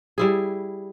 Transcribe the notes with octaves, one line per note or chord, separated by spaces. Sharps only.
G3 E4 G#4